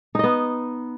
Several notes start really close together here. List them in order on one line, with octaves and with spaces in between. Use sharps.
D#4 D#5 B3